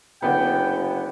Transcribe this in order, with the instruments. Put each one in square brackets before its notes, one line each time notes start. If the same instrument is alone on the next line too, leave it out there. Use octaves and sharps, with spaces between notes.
[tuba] F#1 [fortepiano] D3 B3 [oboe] G5